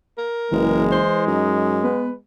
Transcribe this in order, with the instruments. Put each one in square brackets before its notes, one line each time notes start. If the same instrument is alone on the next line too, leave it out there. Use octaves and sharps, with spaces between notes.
[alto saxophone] A#4
[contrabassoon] F#1 [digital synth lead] E3 [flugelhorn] G#3
[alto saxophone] C5
[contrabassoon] F#2 [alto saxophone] D#4
[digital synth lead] B3 [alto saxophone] B4